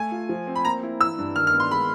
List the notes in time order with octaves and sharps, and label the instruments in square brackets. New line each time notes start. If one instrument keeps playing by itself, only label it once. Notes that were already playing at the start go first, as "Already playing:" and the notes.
Already playing: [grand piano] A3 [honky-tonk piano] G#5
[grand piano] F4
F3
C4
[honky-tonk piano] B5
[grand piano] A#3 [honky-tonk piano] A#5
[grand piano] E4
[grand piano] E3 [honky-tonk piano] E6
[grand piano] G2
[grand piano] D#3 [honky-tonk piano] F6
[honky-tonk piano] F6
[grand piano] B3
[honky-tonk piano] C6
[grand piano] G#3 [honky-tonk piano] B5